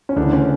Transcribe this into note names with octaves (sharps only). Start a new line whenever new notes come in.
C#4
D2 C#3 E3 D4
C#4